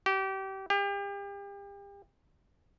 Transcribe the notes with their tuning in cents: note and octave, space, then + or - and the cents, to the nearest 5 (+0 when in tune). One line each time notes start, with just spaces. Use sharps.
G4 -30
G4 +35